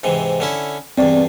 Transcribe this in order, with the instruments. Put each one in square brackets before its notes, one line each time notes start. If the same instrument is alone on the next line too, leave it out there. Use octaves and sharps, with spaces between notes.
[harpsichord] G#2 C3 E3
D3 C#4 E4
[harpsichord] E2 G2 [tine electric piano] C4 D5